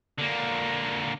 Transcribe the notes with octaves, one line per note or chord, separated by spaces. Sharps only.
D3 A#3